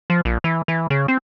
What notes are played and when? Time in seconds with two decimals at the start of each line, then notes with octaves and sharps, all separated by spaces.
0.10 F3
0.25 A#1
0.44 E3
0.68 E3
0.90 C#3
1.08 C4